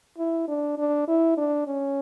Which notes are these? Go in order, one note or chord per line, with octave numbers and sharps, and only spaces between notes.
E4
D4
D4
E4
D4
C#4